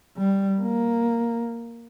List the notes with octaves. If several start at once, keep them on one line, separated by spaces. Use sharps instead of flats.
G3
A#3